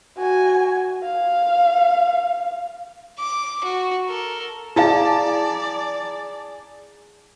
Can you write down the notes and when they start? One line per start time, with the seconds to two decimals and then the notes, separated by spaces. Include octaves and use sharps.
0.17 F#4 G#5
1.03 F5
3.19 D6
3.64 F#4
4.07 A4 A#4
4.76 E4 G#4 D5 F5 A5 A#5